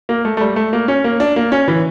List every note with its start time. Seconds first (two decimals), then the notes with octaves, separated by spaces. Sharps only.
0.09 A#3
0.25 A3
0.37 A3
0.41 G3
0.56 A3
0.73 A#3
0.88 C#4
1.04 A#3
1.20 D4
1.36 A#3
1.52 C#4
1.68 E3